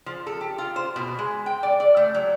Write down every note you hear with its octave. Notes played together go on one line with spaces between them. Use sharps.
F3
A4
G4
F4
C5
B2
G#3
G5
D5
D5
A3
F#3